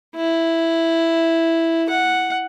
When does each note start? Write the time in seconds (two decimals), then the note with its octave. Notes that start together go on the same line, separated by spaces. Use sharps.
0.16 E4
1.89 F#5